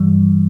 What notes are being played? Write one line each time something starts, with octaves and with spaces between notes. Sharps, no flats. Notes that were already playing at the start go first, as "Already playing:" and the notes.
Already playing: G2 E3 G3